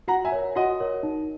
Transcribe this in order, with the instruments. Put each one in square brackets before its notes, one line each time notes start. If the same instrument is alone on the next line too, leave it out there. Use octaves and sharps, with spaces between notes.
[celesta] F#4 [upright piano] F#5 A#5
[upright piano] E5 G#5
[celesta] A#4 C#5
[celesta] F#4 [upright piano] D#5 F#5
[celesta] A#4 C#5
D#4